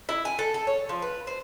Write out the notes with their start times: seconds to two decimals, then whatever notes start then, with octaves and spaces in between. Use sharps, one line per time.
0.09 E4
0.25 G#5
0.39 A4
0.54 A4
0.67 C#5
0.89 F3
1.02 B4
1.27 C5